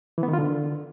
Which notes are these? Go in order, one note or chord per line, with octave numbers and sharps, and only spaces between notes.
E3
B3
D#3
F4
D3